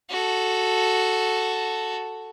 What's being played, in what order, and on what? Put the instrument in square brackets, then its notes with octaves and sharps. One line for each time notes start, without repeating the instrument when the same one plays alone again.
[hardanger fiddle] F#4 A4